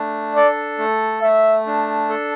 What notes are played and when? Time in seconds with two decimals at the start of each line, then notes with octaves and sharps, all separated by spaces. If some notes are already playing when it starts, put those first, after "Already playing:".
Already playing: A3 D4
0.35 A4 D5
0.78 A3
1.22 A3 E5
1.66 D4
2.10 A4